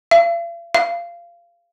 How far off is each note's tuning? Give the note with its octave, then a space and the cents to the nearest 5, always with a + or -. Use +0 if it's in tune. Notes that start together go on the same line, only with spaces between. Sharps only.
F5 -45
F5 -20